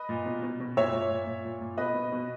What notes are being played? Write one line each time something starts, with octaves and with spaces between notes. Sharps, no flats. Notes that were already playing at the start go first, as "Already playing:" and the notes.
Already playing: B4 D#5
A#2
B2
B2
B2
A#2 C#5 E5
A#2
A#2
A#2
A#2
A#2
B2 B4 D#5
B2
B2